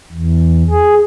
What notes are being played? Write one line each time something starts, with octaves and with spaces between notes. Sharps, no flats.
E2
G#4